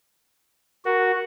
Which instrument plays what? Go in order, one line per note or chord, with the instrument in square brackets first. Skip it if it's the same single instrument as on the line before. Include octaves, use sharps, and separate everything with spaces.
[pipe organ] F#4 [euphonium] A#4